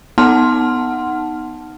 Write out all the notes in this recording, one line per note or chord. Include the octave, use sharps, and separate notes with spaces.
B3 D#4 F#5 A5 C6 F6